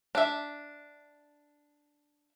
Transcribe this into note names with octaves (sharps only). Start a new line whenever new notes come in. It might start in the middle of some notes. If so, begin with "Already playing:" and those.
D4 E5